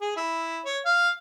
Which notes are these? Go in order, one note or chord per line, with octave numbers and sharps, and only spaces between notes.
G#4
E4
C#5
F5